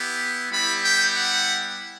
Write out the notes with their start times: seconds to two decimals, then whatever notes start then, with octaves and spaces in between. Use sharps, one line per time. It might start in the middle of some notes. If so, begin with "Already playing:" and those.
Already playing: B3 E4 G4
0.51 G3 B3 E4 G4 B5
0.83 G5
1.16 F#5